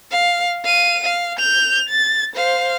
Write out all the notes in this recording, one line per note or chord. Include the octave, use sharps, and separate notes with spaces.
F5
F5 D#7
F5
G6 F7
A6
C5 F5